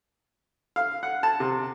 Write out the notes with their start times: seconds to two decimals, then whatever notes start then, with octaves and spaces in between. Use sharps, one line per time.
0.76 F5
1.03 F#5
1.23 A5
1.40 C3